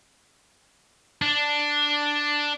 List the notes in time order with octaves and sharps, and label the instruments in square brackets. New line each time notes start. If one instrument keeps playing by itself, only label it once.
[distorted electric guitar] D4